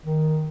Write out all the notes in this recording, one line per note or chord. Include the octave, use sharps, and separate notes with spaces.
D#3